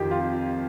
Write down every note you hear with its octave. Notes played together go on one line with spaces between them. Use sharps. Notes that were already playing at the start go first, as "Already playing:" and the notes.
Already playing: F2 D#3 F4 G4
F4